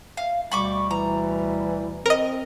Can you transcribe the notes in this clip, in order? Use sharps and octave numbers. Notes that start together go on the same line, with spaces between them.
F5
D2 B2 G3 B5 C#6 D6
E3 A#5
C4 A#4 D#5